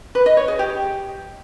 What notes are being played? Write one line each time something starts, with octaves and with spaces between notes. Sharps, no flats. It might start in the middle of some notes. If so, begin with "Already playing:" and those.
B4
D#5
C#5
G#4
G4